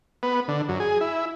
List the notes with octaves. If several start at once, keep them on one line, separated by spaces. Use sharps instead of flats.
B3
D3
F#2
G#4
E4